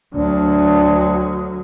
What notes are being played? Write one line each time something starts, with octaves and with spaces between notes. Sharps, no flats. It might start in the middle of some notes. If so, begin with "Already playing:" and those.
D2 F#3 D4